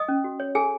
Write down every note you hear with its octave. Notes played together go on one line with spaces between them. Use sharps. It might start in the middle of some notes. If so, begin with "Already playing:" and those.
Already playing: D#5 D#6
C#4
F#4
C#5
G#4 A4 G#5